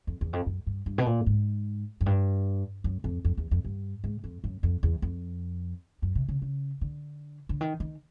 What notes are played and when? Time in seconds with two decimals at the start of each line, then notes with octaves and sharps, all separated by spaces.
0.07 F2
0.21 E2
0.33 F2
0.46 F#2
0.67 G2
0.86 G2
0.98 B2
1.06 A#2
1.26 G#2
2.01 F#2
2.06 G2
2.84 F#2
3.04 F2
3.25 F2
3.37 E2
3.51 F2
3.65 G2
4.04 G#2
4.24 F2
4.44 F#2
4.63 F2
4.83 E2
5.02 F2
6.02 F#2
6.15 C3
6.29 C#3
6.42 C#3
6.81 D3
7.49 D3
7.61 D#3
7.80 D#3